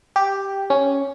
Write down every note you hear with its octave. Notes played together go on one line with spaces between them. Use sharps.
G4
C#4